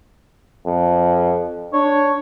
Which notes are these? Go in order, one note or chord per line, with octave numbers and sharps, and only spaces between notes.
F2
D4 C#5